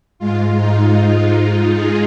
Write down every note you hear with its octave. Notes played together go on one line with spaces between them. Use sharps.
G#2 G#3 F4
D#4
F4
F4
G#4